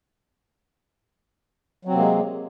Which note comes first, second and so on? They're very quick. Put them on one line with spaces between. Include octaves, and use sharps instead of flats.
F#3 C4 C3 A#3 G#3